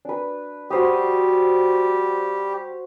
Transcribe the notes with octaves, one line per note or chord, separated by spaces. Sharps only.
D4 B4
G3 F#4 G4 C5 D#6